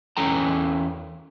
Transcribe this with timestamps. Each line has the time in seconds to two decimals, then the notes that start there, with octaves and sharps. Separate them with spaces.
0.17 E2 C#4 A4 G5 A#5